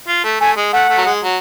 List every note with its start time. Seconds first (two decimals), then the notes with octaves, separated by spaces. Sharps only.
0.08 F4
0.24 A3
0.40 A3 G#5
0.56 G#3
0.73 A3 F#5
0.89 A3
0.98 F#3
1.06 G#3
1.23 F#3